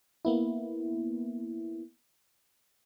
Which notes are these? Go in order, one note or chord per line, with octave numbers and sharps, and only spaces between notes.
A#3 B3 E4